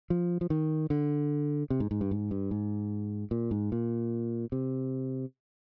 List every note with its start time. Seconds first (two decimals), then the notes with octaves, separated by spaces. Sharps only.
0.10 F3
0.41 F3
0.50 D#3
0.90 D3
1.70 C3
1.80 G#2
1.91 G#2
2.01 G2
2.11 G#2
2.31 G2
2.51 G#2
3.31 A#2
3.51 G#2
3.72 A#2
4.52 C3